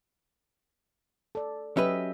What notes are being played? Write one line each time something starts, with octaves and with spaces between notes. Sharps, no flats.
A4 D5
F#3 C#4 G4 B4 D#5 E5